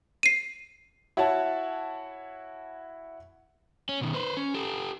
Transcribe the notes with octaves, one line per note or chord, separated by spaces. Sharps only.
C7 D#7
E4 F#4 C#5 F#5 A5
C#4
B2 D#3
B4 C5
C#4
G4 A4